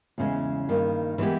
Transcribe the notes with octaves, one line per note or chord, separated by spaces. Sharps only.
E2 C#3 G#3 C#4
G2 D#3 A#3
E3 G#3 B3 G4